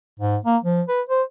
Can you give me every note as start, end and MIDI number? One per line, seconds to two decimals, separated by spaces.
0.20 0.37 44
0.45 0.57 58
0.64 0.82 53
0.88 1.01 71
1.09 1.22 72